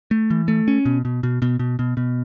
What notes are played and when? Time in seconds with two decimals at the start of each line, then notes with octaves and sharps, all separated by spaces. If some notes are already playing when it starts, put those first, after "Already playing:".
0.11 A3
0.30 E3
0.48 A3
0.68 C#4
0.85 B2
1.05 B2
1.23 B2
1.42 B2
1.59 B2
1.79 B2
1.97 B2